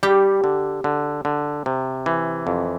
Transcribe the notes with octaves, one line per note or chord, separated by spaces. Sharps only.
G3 G4
D3
D3
D3
C3
E3
F2